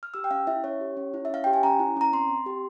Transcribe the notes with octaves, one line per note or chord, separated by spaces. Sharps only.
F6
G4 E6
G5
C#4 F5
E4 E5
C#4 C#5
G4
C#4
E4
E5
C#4 F5
G4 G5
G#5
C#4 A#5
E4
C#4 A#5
C4 C6
C4
G4